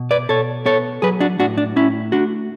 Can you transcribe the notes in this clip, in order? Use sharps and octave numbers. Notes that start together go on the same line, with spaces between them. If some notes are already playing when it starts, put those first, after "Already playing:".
Already playing: B2
B4 D5
B2 A4 C#5
B3 A4 C#5
F#3 G#4 B4
D4 F#4
A2 D4 F#4
D4
A2 C#4 E4
A3 D4 F#4